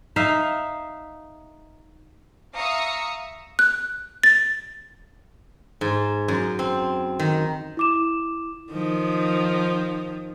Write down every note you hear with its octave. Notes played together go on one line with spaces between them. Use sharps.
D#4 E5 F5
E5 F5 A#5 C#6 D#6 C#7
F#6
A6
G#2
F#2
C4
D#3
E4 D6 E7
D#3 F3